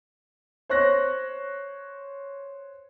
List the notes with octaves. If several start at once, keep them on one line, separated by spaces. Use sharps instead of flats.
C5 C#5 C#6 F#6 A#6